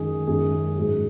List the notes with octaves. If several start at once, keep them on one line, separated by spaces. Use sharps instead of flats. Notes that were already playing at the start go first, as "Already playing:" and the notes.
Already playing: F#2 D#3 G#3 G#4
F#2 D#3 G#3 G#4
G#2 F#3 G#4